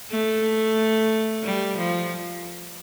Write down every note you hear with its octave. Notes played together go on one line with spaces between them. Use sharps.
A3
G3
F3